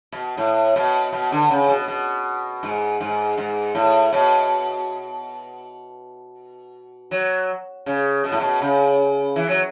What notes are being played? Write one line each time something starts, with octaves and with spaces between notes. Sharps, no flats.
B2
A2
B2
B2
D3
C#3
B2
B2
G#2
G#2
G#2
A2
B2
F#3
C#3
B2
A2
B2
C#3
E3
F#3